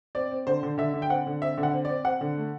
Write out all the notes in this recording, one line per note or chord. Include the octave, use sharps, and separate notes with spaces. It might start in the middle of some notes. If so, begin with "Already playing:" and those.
C4 D5
C4
D3 C5
D3
D3 E5
D3
G5
C4 F#5
D3
C4 E5
D3
F#5
C4
C4 D5
C4 F#5
D3
A3